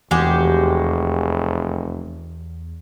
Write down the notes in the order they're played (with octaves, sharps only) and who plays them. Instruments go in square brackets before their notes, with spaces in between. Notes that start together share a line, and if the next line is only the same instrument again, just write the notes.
[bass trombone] F1 [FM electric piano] E2 [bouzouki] G#3 F#4 G4